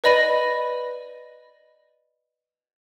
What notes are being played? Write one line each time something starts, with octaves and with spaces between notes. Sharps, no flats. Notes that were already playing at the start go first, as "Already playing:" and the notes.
B4 D5 D#5 B5 A#6 D#7